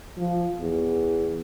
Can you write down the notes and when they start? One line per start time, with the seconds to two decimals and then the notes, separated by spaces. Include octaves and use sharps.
0.18 F3
0.60 E2